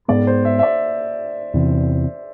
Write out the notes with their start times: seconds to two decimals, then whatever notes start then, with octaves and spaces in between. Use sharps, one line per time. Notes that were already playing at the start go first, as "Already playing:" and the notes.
0.08 G#2 G#3 B3 D5
0.27 C5
0.45 E5
0.59 E5
0.63 D5
1.54 E2 C3 E3